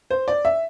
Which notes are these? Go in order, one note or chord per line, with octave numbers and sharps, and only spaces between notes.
C5
D5
E5